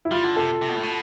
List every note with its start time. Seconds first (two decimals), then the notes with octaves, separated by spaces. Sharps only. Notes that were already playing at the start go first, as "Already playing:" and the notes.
0.05 E4
0.11 G3 F4
0.24 D3
0.36 C3 A4
0.61 C3
0.69 B2
0.76 A2
0.83 B2